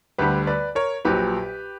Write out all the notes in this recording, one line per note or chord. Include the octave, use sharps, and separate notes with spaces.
D2 D3 G3 G4 B4
B4 D5
A#4 C#5
A#1 A#2 F#3 G4 B4